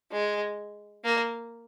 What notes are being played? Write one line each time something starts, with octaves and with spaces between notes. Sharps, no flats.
G#3
A#3